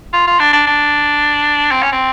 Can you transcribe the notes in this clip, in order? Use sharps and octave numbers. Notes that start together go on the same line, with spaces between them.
F4
F4
D4
D4
D4
C4
C#4
C4